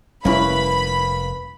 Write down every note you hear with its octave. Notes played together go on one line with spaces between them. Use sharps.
F1 G3 A#3 C#4 E4 B4 B5